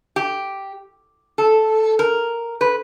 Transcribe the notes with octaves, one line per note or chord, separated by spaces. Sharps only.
G4
A4
A#4
B4